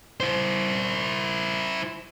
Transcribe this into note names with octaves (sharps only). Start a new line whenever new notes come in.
E4 C5